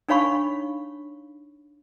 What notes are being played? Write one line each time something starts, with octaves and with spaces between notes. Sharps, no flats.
D4 D#4 C#5 F5 B5 C#6